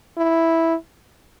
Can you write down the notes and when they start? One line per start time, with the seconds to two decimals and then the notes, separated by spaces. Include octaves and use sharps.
0.18 E4